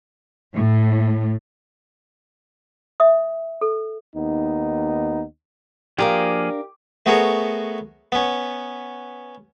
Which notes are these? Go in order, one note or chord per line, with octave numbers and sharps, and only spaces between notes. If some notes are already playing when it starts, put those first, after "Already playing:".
A2
E5 D#6
A4
D#2 B3 D#4
F3 A#3 D4 G4 G#4 A#4 F5
A3 B3 F#4 G#4 A#4 C#5
B3 C#4